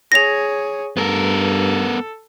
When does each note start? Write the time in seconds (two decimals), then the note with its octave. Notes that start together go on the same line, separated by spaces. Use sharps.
0.12 G#4 C#5 A#6 F7
0.97 G2 B3 A4 A#4